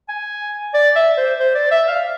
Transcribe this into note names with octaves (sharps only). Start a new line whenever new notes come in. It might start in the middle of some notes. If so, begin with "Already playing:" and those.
G#5
D5
E5
C5
C5
D5
E5
F5